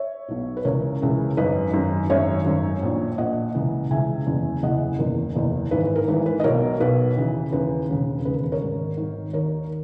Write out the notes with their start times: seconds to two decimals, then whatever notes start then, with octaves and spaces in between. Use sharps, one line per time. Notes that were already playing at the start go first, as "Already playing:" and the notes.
Already playing: C#5 E5
0.28 B1 B2
0.57 B4
0.65 C#2 C#3 E3 A#4 C#5
1.02 C#2 C#3 E3
1.37 G#1 F#2 D#3 B4 D#5
1.73 G#1 F#2 D#3
2.10 G#1 F#2 D#3 C#5 E5
2.45 G#1 F#2 D#3
2.82 A#1 A#2
3.18 A#1 A#2 D#5 F#5
3.55 C#2 C#3 E3
3.91 C#2 C#3 E3 E5 G#5
4.27 F#1 E2 C#3 E3
4.63 F#1 E2 C#3 E3 D#5 F#5
4.99 F#1 E2 D#3 A#4
5.36 F#1 E2 D#3
5.71 G#1 G#2 E3 B4
5.84 B4
5.96 A#4
6.08 G#1 G#2 E3 B4
6.26 B4
6.40 D#5
6.44 B1 B2 A#4 C#5
6.80 B1 B2 B4
7.16 D#2 C#3 E3
7.52 D#2 C#3 E3 B4
7.89 E1 D#2 C#3
8.25 E1 D#2 C#3 B4
8.34 A#4
8.43 B4
8.52 A#4 C#5
8.61 G#1 G#2 D#3
8.97 G#1 G#2 D#3
9.33 D#2 D#3 A#4 C#5